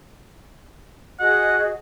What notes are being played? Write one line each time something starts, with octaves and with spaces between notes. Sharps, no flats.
F#4 G#4 D#5 F#5